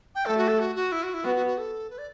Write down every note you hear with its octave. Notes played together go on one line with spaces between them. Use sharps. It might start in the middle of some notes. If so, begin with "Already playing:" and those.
G5
A3 A4
F#4
A4
F#4
F#4
E4
F#4
E4
B3 F#4
F#4
F#4
A4
B4
D5